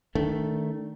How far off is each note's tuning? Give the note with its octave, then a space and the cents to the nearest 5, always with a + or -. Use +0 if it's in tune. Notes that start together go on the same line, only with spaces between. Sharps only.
D#3 +0 A3 +0 D4 -25